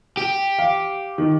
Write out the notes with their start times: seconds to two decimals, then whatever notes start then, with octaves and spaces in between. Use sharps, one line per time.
0.17 G4
0.59 F5
1.18 D#3